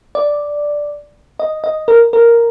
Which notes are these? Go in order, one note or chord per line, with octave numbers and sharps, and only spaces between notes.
D5
D#5
D#5
A#4
A#4